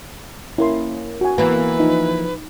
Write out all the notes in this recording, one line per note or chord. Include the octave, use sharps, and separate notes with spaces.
A#3 C#4 E4 C6
F#4 G#5
E3 A#3 B3 B4
F3 D#4